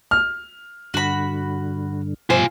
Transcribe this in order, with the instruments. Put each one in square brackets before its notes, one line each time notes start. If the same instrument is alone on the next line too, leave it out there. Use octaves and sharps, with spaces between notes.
[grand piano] F6
[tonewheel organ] G2 D3 [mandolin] F#4 B5
[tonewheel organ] G2 B2 F3 [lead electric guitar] F4 G#5 [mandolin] C5 E5